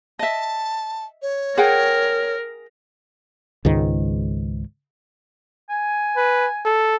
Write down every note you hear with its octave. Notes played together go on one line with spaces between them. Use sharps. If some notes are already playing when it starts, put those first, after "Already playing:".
D#5 E5 A5
C#5
G#4 A#4 F#5 G5
C#2 G#2 D#3
G#5
B4
A4